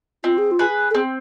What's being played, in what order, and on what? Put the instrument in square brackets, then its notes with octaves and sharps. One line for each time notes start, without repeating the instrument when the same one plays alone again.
[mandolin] C4 [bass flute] F4
[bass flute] G#4
F4
[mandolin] G#4 B4
[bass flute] A4
[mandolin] C4 [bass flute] G#4